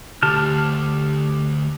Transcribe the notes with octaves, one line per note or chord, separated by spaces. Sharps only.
D2 G4 A5 F6